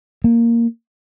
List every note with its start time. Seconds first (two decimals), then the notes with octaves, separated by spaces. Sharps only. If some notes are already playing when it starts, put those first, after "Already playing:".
0.24 A#3